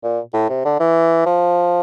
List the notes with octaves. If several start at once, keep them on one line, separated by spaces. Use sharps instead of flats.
A#2
A2
C3
D3
E3
F3